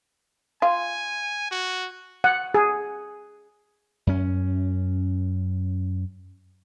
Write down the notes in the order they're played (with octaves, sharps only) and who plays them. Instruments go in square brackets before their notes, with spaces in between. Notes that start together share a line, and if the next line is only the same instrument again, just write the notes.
[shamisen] F4 [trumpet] G#5
[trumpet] F#4
[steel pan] F#5
G#4
[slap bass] F#2 C#4